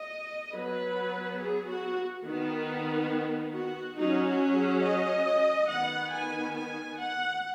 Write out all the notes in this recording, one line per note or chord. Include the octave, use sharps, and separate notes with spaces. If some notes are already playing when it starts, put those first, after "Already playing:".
Already playing: D#5
F#3 B3 B4
G#4
F#4
D#3 B3
F#4
F#3 C#4 D#4
F#4
G#4
D#5
D#3 B3 F#5
G#5
G#5
F#5